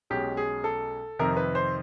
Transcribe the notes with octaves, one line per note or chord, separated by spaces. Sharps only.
B1 B2 G#3 C#4 G4
G#4
A4
F2 C3 D#3 A#4
B4
C5